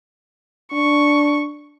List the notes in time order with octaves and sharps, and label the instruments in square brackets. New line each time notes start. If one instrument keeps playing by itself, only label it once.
[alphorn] D4 [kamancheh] C#6